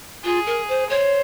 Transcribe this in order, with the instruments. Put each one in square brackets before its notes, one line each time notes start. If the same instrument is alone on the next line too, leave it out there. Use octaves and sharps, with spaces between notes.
[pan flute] F4 [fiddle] G#4
[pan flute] A#4
C5
[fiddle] C5 [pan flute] C#5